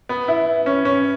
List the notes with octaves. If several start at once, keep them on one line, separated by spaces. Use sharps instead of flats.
B3
E4
C#4
C#4